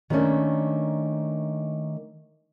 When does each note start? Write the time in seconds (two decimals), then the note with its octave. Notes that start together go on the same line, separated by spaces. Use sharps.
0.10 D#3 G3 A3 A#3 C#4 D4